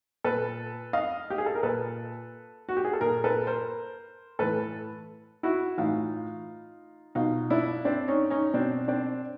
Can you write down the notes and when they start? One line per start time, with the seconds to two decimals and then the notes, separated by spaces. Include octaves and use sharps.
0.24 A#2 A4 B4
0.93 D#5 F5
1.30 G4
1.38 G#4
1.46 A4
1.55 A#4
1.63 A#2 A4 B4
2.69 F#4
2.77 G4
2.85 G#4
2.93 A4
3.01 A#2 G#4 A#4
3.24 A4 B4
3.47 A#4 C5
4.39 A2 E3 A4 B4
5.43 E4 F#4
5.78 A2 E3 D#4 F4
7.15 B2 D#4 F4
7.50 D4 E4
7.85 C4 D4
8.08 C#4 D#4
8.30 C#4 D#4
8.54 B2 C4 D4
8.88 C4 D4